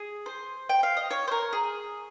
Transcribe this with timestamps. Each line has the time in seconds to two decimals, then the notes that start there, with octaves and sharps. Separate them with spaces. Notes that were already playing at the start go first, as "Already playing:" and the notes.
Already playing: G#4
0.26 C5
0.69 G5
0.83 F5
0.97 D#5
1.10 C#5
1.28 C5
1.31 A#4
1.53 G#4